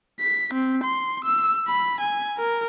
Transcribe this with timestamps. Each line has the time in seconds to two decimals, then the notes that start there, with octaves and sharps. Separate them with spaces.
0.20 B6
0.54 C4
0.84 C6
1.25 E6
1.68 B5
2.01 G#5
2.38 A#4